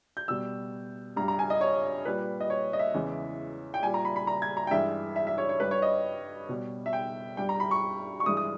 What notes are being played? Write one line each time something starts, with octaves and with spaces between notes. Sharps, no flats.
G6
B2 G3 E6
G2 G3 A#5
A#5
G#5
D#5
C#5
A#2 G3 B4
D#5
C#5
D#5
E5
E2 C#3 E3 G#3
G5
A#2 G3 G#5
A#5
B5
B5
A#5
G#6
A#5
G5
G2 E3 G#3 E5
E5
E5
C#5
C#5
G2 G3 B4
C#5
D#5
B2 G3
E5
G5
G2 G3 G5
A#5
B5
C#6
C#6
G2 E3 G#3 D#6
D#6